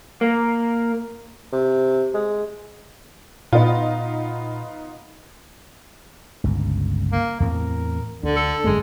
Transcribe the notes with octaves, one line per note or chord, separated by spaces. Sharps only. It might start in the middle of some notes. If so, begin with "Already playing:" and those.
A#3
C3
G#3
A#2 B3 D#4 F4
G1 C#2
A#3
E2 A2 C4 A#4
D2 D3
A4
G1 F#2 G#3 A3